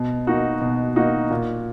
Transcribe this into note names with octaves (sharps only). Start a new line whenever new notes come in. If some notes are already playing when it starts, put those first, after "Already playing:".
Already playing: B2
A#3 D#4 F#4
B2
A#3 D#4 F#4
A#2